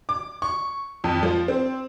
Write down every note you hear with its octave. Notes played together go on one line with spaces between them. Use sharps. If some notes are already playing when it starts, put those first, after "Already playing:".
D6
C#6
F2
F3
C4